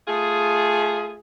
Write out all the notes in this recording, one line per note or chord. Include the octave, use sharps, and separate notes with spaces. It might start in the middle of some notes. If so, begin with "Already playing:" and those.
A3 F4 G#4